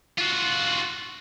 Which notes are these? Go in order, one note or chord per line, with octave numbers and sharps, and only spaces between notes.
F4 F#4